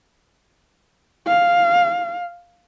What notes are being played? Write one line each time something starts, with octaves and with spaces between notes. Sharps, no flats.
F5